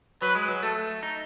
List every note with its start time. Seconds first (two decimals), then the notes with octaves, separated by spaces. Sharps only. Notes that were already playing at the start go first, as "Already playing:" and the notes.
0.22 F#3 B4
0.35 G#3
0.48 F#3
0.63 A3 A4
1.03 D#4